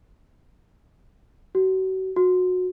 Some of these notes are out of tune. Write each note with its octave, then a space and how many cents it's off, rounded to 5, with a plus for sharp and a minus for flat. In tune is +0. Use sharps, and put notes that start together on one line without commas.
F#4 +35
F#4 -20